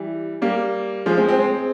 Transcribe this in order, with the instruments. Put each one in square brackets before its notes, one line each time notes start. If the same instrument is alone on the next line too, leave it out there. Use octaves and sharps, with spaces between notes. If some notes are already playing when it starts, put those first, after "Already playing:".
Already playing: [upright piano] E3 G3
G3 A#3
F3 G#3
G#3 C4
G#3 C4
G#3 C4